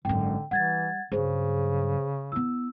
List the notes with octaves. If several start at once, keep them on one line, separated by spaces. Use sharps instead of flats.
G#1 F#2 D3 G5
E3 G3 F#5 G#6 A6
G2 C#3 F#3 G#4 C5
B3 E4 E6